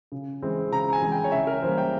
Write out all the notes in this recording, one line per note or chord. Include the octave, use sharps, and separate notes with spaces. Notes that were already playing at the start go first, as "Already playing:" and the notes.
C#3
E3 G#3 C4
C#3 A#5
G#5
E3 G#3 C4
G5
C#5
C#3 E5
A#4
E3 G3 A#3 C5
G5